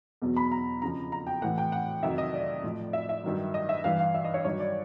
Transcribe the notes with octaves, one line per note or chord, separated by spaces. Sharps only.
E2 B2 F#3
B5
A#5
F2 C#3 F3 A#5
A#5
G5
A2 E3 F#5
G5
F#5
F2 C3 D#3 F#3 E5
D#5
D5
A2 F3
E5
E5
G2 D#3 F#3
D#5
E5
G2 E3 F5
F5
E5
D#5
C#5
G2 D#3 F#3 C#5
D5